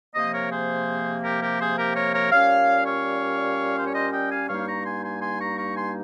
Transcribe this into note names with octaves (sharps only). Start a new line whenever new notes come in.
C3 F3 A#3 C5 D#5
A#4 C#5
G#4 C5
G4 A#4
G4 A#4
G#4 C5
G4 A#4
A#4 C#5
A#4 C#5
A#2 G3 C#4 C#5 F5
C#5 F5
C5
C#5
C5 D#5
D#5 G5
F5 G#5
G2 G3 A#3 D#4 C#5 F5
A#5 C#6
G#5 C6
G#5 C6
G#5 C6
A#5 C#6
A#5 C#6
G#5 C6